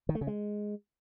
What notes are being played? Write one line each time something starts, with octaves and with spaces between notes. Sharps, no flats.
D#3
A3
C#3
G#3